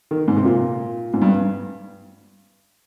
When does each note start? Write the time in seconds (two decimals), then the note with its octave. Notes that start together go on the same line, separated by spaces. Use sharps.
0.11 D#3
0.28 G#2
0.37 C3
0.45 A#2
1.14 G#2
1.22 G2